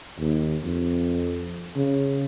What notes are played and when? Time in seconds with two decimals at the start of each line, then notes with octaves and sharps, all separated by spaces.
0.19 D#2
0.64 F2
1.76 C#3